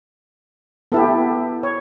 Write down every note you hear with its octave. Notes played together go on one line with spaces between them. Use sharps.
B3 E4 G4 A4
C#5